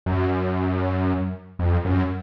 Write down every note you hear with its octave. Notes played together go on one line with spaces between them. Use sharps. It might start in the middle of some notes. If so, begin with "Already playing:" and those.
F#2
F2
F#2